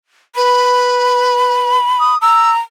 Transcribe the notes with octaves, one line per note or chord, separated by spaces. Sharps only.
B4 B5
D#6
A#5 E6